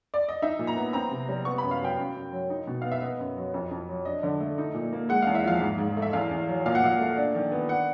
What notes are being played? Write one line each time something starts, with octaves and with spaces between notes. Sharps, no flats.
D5
D#5
D#4 E5
A#2
A#5
B3
C4 A#5
C3
G3
B3 C#6
B5
F#2
F5
F#3 G5
F#2
F#2
F#3
D#4
B2
B3 F5
E5
B3 D#5
F#2
F#3
F2
F2
F#3
D4 D#5
D3
A3
D#4
A#2
A#3
G#3 F#5
E2 F5
E5
F3 F5
G#2
G#2
A3
E5
E2 F5
E2
F#3
A#2 F5
F#5
A#2 F5
A3
D4
D#3
B3
D4 F#5